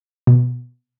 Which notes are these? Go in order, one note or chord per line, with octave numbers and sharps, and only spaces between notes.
B2